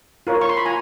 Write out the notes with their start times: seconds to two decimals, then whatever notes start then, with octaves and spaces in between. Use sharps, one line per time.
0.27 F4 A#4 C#5
0.41 C#6
0.49 C6
0.57 B5
0.66 F4 G#5 A#5